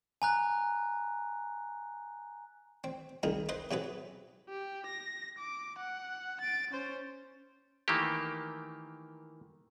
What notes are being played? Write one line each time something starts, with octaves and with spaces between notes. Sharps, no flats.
G#5 A#5 F#6
C4
C2 D#3 G#4 A#4
B4 C5 D#5 C6
C3 F#3 G#4 B4
G4
A#6
D6
F#5
A6 D7
C#4 C5
D#3 E3 A3 A#3 G4